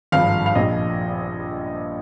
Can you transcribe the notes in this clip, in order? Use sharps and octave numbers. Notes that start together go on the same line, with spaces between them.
G#1 G2 F3 F5
F5
A#1 A#2 F3 D#5